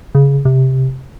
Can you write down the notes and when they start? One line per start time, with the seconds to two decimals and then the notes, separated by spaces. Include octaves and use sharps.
0.15 C#3
0.45 C3